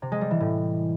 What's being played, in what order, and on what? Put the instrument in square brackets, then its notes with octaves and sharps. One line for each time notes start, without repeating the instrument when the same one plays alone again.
[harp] C3
G#3
G3
E3
A2